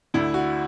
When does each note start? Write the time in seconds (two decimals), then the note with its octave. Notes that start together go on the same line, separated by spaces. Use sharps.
0.14 D2 D3 E4
0.34 F#4